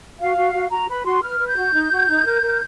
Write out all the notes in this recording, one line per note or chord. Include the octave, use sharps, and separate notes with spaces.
F#4 F5
F#4
F#4
F#4 A#5
B4 B5
F#4 C6
B4 F6
B4
G6
F#4
D#4
F#4
D#4
A#4
A#4